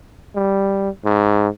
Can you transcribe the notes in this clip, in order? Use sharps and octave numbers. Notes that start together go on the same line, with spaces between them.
G3
G#2